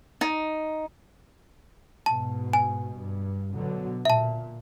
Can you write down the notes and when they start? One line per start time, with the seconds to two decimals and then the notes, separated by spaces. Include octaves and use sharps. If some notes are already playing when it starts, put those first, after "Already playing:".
0.21 D#4
2.06 G#2 B2 A5
2.53 G#5
2.94 G2
3.54 B2 D3 F#3
4.05 A#2 E5 A5